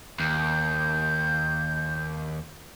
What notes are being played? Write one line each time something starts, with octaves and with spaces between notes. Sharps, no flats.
D#2 G6